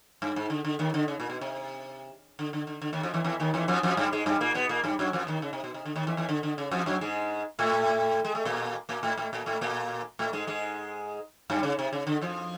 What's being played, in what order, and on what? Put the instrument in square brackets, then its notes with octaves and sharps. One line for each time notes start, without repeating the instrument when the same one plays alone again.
[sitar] G2
G#2
D3
D3
D#2 D#3
D3
C#3
A#2
B2
C3
D3
D3
D3
D3
D#2 D#3
F2 F3
E2 E3
E2 E3
D#2 D#3
E2 E3
F2 F3
F2 F3
G2 G3
G#2 G#3
G2 G3
A#2 A#3
B2 B3
A#2 A#3
G2 G3
F#2 F#3
F2 F3
D#2 D#3
C#3
C3
B2
C3
D3
D#2 D#3
E2 E3
E2 E3
D3
D3
C#3
F2 F3
F#2 F#3
G#2 G#3
A2 A3
G#3
A3
A#2 A#3
A#2 A#3
A2 A3
A2 A3
A#2 A#3
A2 A3
A#2 A#3
A2 A3
G#2 G#3
G#2 G#3
G2 G3
C#3
C3
C#3
D3
F2 F3